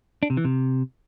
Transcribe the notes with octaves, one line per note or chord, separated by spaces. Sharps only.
D4
C3
E3
C3